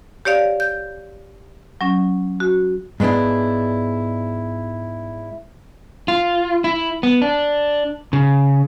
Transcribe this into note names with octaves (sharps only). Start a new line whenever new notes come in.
G4 C#5 D5 F5
G6
F#3 C#4
F#4
G#2 G#3 B3 D4 E4
F4
E4
B3
D4
C#3